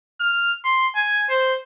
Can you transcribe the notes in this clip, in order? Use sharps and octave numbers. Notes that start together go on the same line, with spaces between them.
F6
C6
G#5
C5